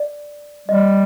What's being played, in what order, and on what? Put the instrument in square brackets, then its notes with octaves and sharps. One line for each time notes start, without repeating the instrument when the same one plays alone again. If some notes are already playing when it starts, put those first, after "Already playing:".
Already playing: [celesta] D5
[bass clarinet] G3 [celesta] D#5